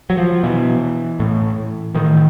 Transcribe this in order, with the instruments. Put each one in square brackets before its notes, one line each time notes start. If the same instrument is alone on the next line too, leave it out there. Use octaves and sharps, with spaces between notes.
[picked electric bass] F#3
F3
B2 E3
A2
A2 D#3